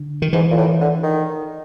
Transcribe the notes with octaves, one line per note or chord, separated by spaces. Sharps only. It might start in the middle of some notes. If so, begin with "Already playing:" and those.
Already playing: D3
D#3
G#2 E3
A#2
A2
D3
D#3